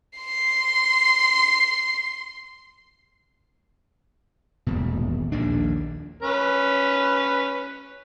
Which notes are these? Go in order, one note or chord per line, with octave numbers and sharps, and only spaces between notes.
C6 C7
D#1 G#1 E2 B2
A#1 D#2 A#2 D4
C#4 B4